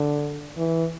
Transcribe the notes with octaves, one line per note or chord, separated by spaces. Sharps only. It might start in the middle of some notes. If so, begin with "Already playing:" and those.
Already playing: D3
E3